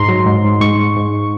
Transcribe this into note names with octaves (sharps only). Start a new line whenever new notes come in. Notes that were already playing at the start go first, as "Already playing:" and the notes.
Already playing: G#2 A#5 C6
F#3
G#2
G#2
G#2 C#6
G#2
G#2